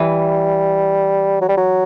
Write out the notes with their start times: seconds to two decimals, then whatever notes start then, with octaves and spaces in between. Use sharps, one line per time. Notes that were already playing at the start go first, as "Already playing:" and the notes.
Already playing: E3 G3
1.41 F#3
1.48 G3
1.57 F#3